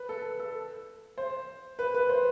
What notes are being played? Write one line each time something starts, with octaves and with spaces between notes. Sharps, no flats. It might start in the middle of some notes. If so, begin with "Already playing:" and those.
Already playing: B4
A4
A4
C5
B4
B4
C5